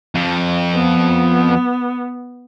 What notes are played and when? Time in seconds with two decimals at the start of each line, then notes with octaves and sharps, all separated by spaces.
0.15 F2 F3
0.75 B3